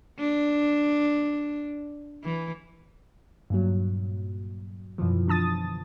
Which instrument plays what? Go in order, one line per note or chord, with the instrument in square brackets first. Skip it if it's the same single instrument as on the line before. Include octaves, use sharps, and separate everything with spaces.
[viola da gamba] D4
E3
[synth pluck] G2 A#2 F#3
F#2 B2 E3 F3
D3 F3 A5 D#6 A6